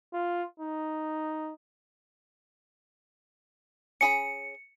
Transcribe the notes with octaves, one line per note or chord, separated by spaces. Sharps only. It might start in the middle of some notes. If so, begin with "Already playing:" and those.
F4
D#4
C#4 G#4 B5 C#7